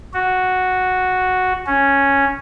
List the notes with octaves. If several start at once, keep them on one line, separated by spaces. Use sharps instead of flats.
F#4
C#4